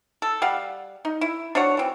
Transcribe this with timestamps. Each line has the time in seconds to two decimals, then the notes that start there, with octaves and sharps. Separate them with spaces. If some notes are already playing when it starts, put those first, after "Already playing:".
0.22 A4
0.42 G3 F5 F#5
1.05 D#4
1.21 E4
1.55 D4 F#4 C#5 F#5
1.77 E3 C4